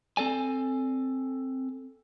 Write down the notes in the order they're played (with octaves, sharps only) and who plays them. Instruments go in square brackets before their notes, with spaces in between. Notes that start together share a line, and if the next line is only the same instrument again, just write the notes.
[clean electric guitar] C4 A4 D5 G#5